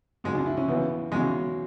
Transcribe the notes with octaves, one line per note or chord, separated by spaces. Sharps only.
C#2 C#3 F#3 G#3
D4
E4
C#4
E2 C#3 E3 B3
E2 C#3 F#3 G#3